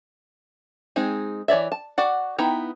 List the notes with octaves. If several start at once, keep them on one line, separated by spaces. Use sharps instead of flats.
G#3 C4 D#4 G#4
E3 C#5 D5 E5
A5
F#4 D5 F#5
B3 D#4 E4 G5 A#5